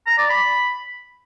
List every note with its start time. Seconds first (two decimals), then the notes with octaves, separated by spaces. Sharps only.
0.06 A#5
0.18 D5
0.30 B5